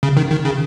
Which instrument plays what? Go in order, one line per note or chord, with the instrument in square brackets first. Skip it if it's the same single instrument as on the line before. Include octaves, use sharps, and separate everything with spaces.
[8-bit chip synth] C#3
D#3
D#3
C#3